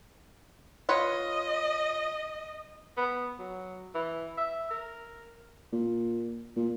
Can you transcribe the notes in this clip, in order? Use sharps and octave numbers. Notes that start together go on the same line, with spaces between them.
F4 B4 C#5 D#5
B3
F#3
E3
E5
A#4
A#2
A#2